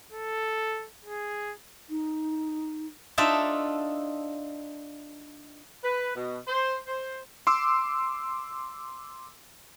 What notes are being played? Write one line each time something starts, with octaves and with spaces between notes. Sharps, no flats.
A4
G#4
D#4
D4 D#4 F4 A4 D5 E5
B4
B2
C5
C5
C6 D6 E6